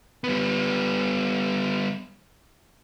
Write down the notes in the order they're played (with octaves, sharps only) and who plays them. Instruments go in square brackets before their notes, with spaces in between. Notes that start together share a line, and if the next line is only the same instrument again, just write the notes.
[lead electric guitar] G3 B3